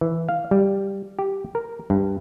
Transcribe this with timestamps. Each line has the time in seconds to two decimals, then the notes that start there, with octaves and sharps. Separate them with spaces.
0.01 E3
0.29 F5
0.51 G3
1.19 G4
1.55 A#4
1.90 G2